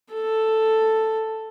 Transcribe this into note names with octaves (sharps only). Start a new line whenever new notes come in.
A4